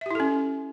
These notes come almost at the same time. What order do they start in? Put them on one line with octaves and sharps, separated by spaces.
E5 G4 E4 A4 C#4